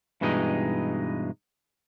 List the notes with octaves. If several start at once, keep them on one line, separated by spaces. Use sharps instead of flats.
G2 B2 E3 G#3 C4 D#4